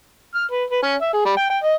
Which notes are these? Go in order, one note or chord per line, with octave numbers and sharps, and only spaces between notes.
F6
B4
B4
C#4
E5
G#4
G3
G5
G5
D#5